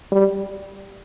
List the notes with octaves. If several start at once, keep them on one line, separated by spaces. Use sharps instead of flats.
G3